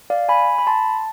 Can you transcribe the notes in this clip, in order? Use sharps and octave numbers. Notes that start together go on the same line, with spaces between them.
D5 F5
G#5 B5
B5
A5 C6